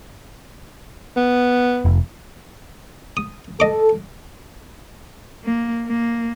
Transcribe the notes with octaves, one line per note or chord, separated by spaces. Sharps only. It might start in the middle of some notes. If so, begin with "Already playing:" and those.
B3
F1
D#6
A4 D#5 D6
A#3
A#3